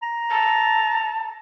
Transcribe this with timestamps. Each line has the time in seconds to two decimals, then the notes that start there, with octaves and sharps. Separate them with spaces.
0.03 A#5
0.31 A5